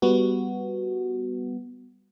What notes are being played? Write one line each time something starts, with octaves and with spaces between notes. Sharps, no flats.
G3 B3 F#4